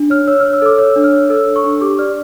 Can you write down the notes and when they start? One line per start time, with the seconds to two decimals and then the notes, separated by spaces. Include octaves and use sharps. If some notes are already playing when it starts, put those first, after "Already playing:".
Already playing: D4
0.10 C#5 F6
0.28 C#5 E6
0.40 F6
0.45 C#5
0.53 E6
0.62 A4 D6
0.78 C#5 E6
0.96 D4
1.04 F6
1.13 C#5
1.30 A4 E6
1.47 A4
1.56 C#6
1.64 D4
1.81 G4 D6
1.99 D5 F6